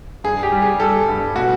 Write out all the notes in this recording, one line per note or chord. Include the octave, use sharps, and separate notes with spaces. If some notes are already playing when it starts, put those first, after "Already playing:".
G2 G#4
G4
G3
G#4
G3 A4
G2
B2 F#4